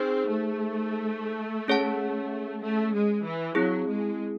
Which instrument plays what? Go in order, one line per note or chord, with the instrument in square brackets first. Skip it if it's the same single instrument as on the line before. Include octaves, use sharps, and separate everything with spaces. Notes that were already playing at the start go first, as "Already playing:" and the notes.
Already playing: [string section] C4 [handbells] D#4 G#4 C5
[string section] A3
[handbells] C#4 G#4 C#5 F#5 A5
[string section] A3
G#3
E3
[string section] F#3 [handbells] C4 E4 G#4
[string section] G#3